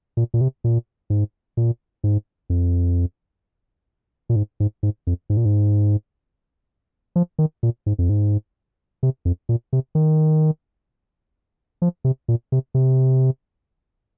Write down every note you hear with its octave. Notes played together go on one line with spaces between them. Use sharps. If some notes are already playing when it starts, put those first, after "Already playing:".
A#2
A#2
C3
A#2
G#2
A#2
G#2
F2
A#2
G#2
G#2
G#2
F2
G#2
A#2
G#2
F3
D#3
A#2
G#2
F2
G#2
C3
F2
A#2
C3
D#3
F3
C3
A#2
C3
C3